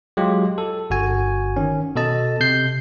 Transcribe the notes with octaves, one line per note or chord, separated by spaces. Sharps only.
F#3 G#3 F4 G4
A4
G1 F#4 G#5
D#3 C#4
B2 A4 D#5 A5
C3 G6 C7